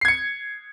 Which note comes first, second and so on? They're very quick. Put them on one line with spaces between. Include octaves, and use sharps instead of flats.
C7 G#6 C#7